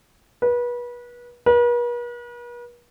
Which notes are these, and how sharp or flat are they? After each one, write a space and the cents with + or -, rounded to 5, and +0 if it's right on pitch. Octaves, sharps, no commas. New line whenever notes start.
B4 -30
B4 -45